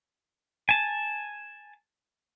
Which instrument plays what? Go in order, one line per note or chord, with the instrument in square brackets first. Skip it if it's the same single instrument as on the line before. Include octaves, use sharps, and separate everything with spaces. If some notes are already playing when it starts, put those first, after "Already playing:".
[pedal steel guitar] G#5 A5